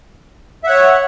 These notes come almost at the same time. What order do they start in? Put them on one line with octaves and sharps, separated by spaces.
E5 F#5 C#5